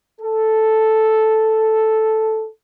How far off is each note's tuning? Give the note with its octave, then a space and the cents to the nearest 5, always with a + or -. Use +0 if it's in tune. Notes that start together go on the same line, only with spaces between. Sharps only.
A4 -5